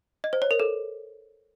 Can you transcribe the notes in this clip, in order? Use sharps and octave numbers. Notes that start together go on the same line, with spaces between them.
D#5
C5
C#5
A#4
A4